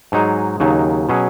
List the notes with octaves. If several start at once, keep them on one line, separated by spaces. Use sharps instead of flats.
G#2 F#3 D#4 G#4
D#2 C#3 F#3 D#4
B2 F#3 C#4 G#4